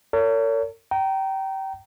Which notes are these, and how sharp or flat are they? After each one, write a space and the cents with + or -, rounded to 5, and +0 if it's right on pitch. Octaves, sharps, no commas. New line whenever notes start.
A#4 -45 C#5 +35
G5 -25 A#5 +0